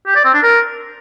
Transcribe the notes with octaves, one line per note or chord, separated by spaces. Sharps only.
G4
D5
C4
D4
A#4